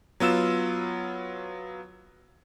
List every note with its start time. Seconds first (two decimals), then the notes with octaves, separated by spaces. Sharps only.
0.20 F#3 B3 F4 E6 E7